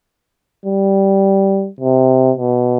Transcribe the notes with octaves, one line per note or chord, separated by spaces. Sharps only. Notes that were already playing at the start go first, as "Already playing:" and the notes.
G3
C3
B2